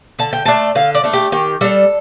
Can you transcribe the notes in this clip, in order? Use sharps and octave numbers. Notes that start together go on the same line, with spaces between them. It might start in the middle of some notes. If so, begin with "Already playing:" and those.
D3 A5
G5
A3 D4 A5
D3 F5
D5
A3 D4
G4
D#3 G4
G3 D4 A4